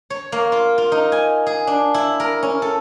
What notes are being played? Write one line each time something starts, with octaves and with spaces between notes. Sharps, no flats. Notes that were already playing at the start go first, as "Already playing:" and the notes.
C#5
A#3
F4
F4
D#4
G#5
G#4
D4
E4
A#4
C#4
A4